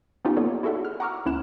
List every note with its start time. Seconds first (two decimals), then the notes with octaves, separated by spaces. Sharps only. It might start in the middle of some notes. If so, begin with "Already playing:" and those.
0.25 B3 C#4 D#4 F4 G4
0.37 A#3 B3 A4 C#5 D5
0.63 E4 F#4 G#4 A4 E5 F#5
0.85 F6
1.00 F#5 A#5 C#6 D6 E6 F6
1.26 D2 C#4 E4 F#6 E7